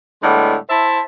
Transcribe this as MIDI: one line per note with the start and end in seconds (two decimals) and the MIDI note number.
0.22 0.56 45
0.22 0.56 50
0.22 0.56 55
0.22 0.56 56
0.22 0.56 59
0.69 1.00 64
0.69 1.00 72
0.69 1.00 76
0.69 1.00 81